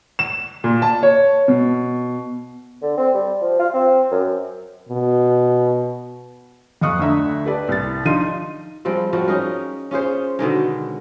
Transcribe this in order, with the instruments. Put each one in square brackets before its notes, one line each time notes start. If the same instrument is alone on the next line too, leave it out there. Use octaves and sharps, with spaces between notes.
[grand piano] E7
A#2
A5
C#5
B2
[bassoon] D3
C4
G3
F3
F4
C4
F#2
[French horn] B2
[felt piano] F2 D#5 F5 C#6 D#6 F#6
D2 D3 E5 A#5
G4 B4 D5 A5
C2 A6
F3 D4 D#4 F5 C6 D#7
[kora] F3 G3 G#3 C4
F3 G3 F#4
C#4 D#4 G#4 A#4
C#4 F4 G#4 C5
B2 D3 D#3 G#3